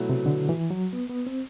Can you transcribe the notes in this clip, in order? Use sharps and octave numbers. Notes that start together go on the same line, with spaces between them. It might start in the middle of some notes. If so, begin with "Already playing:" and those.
Already playing: B2 F#3 A3 E4 B4
C3
D3
E3
F#3
B3
B3
C4